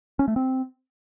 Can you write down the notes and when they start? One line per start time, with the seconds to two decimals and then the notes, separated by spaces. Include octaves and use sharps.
0.19 C#4
0.28 A3
0.36 C4